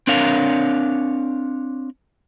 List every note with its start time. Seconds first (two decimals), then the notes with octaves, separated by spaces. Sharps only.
0.07 C4 D4 A#4 C#5 F5